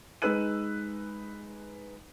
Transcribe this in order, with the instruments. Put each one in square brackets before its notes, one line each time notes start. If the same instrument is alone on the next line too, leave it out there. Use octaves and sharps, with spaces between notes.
[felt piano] G#3 D#4 B4 E6 F#6 D#7